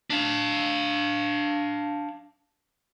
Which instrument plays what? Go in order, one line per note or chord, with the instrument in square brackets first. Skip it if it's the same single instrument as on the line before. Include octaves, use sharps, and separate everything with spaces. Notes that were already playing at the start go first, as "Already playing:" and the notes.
[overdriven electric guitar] D4 F5